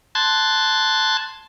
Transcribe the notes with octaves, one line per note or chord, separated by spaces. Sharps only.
A5 C6 F#6 G#6 A6